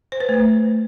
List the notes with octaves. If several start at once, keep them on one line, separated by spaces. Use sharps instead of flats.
C5
B4
A3